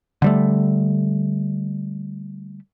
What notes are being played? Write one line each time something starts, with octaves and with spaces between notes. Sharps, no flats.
D3 G3 A3